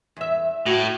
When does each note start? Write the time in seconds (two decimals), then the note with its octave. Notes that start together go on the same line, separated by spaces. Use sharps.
0.17 E2 E5
0.66 A2 F#4